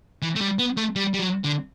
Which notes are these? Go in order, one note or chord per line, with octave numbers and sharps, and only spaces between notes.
E3
A3
G3
B3
A3
G3
G3
F#3
D3